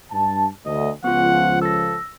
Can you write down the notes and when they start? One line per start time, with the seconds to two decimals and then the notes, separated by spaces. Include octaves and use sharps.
0.12 G2 A5
0.66 D2 D#5
1.04 C#2 F3 B3 F4 F#5
1.62 A4 E6 A#6